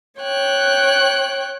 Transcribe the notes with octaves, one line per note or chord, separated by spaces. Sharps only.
C#5 G5 F#6